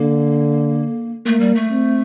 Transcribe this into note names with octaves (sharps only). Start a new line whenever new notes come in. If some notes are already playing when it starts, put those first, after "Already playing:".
Already playing: D3 A#3
A3 A#3
G3
A3
C4